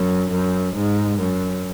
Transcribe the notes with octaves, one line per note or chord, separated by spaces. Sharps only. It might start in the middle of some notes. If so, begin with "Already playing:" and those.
Already playing: F#2
F#2
G#2
F#2